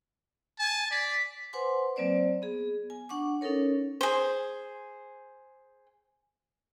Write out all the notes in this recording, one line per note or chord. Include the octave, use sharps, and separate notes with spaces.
G#5 A5
D5 B6
B4 C5 F#5 G#5 C6 D6
F#3 A#3 C4 C5 D5
B3 G#4
G#5
D4 F#5 C#6 D6
C#4 D#4 A4 A#4 C#5
G#4 C5